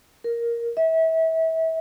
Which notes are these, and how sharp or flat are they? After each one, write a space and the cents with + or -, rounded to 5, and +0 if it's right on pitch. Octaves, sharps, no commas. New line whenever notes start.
A#4 +5
E5 -30